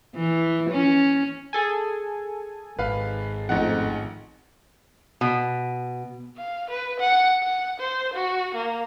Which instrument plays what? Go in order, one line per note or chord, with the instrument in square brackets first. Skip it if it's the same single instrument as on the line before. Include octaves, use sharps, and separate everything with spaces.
[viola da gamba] E3
C#4
[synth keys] G#4 A4 G#5
[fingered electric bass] G#1 [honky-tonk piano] B4 F5
[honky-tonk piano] A1 D#4 F#5 [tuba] F2
[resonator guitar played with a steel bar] B2
[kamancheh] F5
B4
F#5
F#5
C5
F#4
A#3